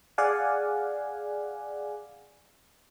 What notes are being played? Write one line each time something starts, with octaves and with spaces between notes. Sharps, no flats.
G#4 D5 F5 F#5 G#5